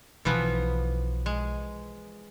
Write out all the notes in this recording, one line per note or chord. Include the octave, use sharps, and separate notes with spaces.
B1 E3 F3 B3
G#3